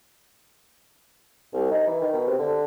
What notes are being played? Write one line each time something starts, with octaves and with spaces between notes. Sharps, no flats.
C2
D#4
E3
D#3
B2
C3
D3